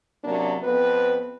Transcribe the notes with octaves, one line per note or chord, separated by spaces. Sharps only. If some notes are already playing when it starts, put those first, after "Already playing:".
F#2 C3 F#3 A#3 D4
F2 B3 C4 B4